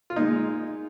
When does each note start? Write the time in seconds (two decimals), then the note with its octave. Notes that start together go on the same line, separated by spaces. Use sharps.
0.10 F4
0.16 A#2 G#3 D#4